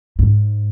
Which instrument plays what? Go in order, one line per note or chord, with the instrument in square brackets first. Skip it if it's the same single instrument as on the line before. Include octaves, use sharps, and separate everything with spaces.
[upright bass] G#2